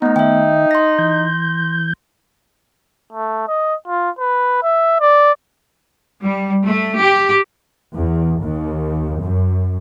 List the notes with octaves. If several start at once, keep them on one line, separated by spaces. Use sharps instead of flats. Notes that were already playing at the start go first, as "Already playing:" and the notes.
A3 B3 D#4 F#5 A#5
D#3 E5 G5
C6 A#6
E3 G6
A3
D#5
F4
B4
E5
D5
G3
A3
G4
E2
D#2
F#2